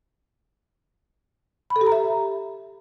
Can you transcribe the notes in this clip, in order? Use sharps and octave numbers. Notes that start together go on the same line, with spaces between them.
B5
A4
G4
A#5
E5